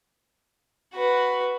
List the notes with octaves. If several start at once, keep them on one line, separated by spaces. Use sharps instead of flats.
F#4 B4